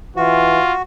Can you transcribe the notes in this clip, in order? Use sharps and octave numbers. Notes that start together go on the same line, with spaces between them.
E3 F4 F#4